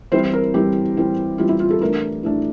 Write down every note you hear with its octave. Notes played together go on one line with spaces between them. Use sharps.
E3 G3 C4 E4 C5
A#4
E3 G3 C4 E4 G4
E3 G3 C4 E4
E3 G3 C4 E4 F4
E4
F4
A4
E3 A3 D4 A#4
E3 A3 D4